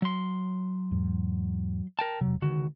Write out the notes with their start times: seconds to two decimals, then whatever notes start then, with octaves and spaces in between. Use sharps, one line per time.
0.02 F#3 C6
0.91 E2 G#2
1.99 A#4 G5 A5
2.21 E1 C3 F#3
2.42 C#2 D3 D#3 G#3 F#4